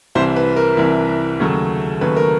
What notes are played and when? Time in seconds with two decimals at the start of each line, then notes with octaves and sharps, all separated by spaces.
0.15 C2 C3 E3 C5
0.36 B4
0.56 A#4
0.77 C2 C3 E3
1.40 D#2 C#3 F#3 A3
2.01 D#2 C#3 F#3 A3 B4
2.16 A#4